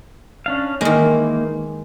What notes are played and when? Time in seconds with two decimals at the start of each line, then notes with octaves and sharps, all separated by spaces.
0.46 C#4 D4 F5
0.81 D#3 E3 G#3 A#3 D#4